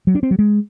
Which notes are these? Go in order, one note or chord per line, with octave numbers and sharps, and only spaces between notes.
F#3
D4
C4
F#3
G#3